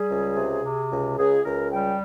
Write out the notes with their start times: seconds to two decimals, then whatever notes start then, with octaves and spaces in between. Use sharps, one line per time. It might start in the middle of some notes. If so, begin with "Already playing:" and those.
Already playing: G3 G#4
0.10 C#2
0.36 C3
0.63 C3
0.91 C#2
1.18 C#2 G#4
1.44 C#2 A#4
1.72 G3 G5